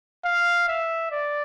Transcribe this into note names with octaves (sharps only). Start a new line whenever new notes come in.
F5
E5
D5